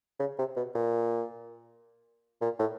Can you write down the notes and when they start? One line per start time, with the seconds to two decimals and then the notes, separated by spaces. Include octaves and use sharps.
0.20 C#3
0.38 C3
0.56 B2
0.75 A#2
2.41 A#2
2.59 A2